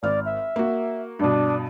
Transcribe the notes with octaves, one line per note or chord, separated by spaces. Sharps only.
G#1 D5 F6
E5
A#3 F#4
G2 B2 D4